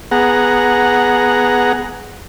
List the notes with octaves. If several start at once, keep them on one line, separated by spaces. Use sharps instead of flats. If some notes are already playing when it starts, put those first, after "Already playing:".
B3 G#4 F#5 A#5